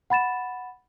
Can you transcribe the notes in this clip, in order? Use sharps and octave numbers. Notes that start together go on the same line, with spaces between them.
F#5 B5 A6 E7